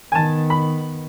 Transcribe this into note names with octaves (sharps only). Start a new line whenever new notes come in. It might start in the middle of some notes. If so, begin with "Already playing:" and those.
D#3 B3 G#5 A5
B5